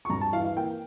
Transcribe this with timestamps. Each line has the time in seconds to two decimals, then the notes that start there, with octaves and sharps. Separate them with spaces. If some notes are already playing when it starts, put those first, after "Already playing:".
0.05 C#6
0.10 G2 A#5
0.21 A5
0.33 E3 F5
0.44 F5
0.57 A#3 G5